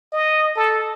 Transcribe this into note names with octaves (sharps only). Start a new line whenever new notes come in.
D#5
A4